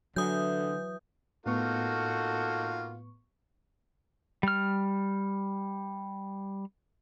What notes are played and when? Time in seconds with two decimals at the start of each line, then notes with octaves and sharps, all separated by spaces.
0.16 D3 E3 F#3 D#6 G6
1.46 A2 A#3 B3 D#4 F4 F#4 A4 C#6
4.43 G3 F6